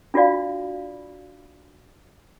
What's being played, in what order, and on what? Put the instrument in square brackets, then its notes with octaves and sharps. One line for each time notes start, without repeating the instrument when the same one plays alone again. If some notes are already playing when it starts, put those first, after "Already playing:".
[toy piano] D4 F4 F#4 D5 F5